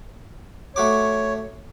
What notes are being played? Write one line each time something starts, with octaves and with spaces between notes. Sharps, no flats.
A3 F#4 C#5 D6